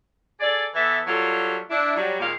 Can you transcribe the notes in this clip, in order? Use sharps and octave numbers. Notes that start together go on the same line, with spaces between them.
G#4 A4 D5
E3 B3 A4 E5
F#3 G3 A#3 F4 A4
D4 E4
F#3 G3
A#2 D#3 G#3 F5